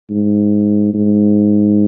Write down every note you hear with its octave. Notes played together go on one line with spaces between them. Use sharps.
G#2
G#2